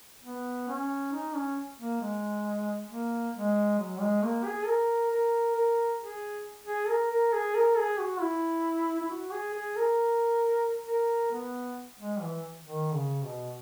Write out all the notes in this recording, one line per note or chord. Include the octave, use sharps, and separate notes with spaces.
B3
C#4
D#4
C#4
A#3
G#3
A#3
G#3
F#3
G#3
A#3
G#4
A#4
A#4
A#4
G#4
G#4
A#4
A#4
G#4
A#4
G#4
F#4
E4
E4
F#4
G#4
G#4
A#4
A#4
B3
G#3
E3
D#3
C#3
B2